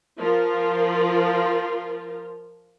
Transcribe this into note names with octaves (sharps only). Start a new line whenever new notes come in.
F3 F4 A#4